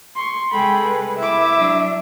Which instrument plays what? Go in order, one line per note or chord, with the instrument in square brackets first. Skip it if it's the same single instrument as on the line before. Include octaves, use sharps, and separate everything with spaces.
[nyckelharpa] C6 C#6
[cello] C3 G#3 [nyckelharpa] G#4 A4 [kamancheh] G5 B5
[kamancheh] B4
[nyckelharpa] E4 D6 [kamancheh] E5
[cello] F#3 D4